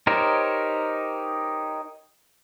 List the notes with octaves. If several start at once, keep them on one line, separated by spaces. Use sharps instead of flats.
D#4 G4 A#4 C5 C#5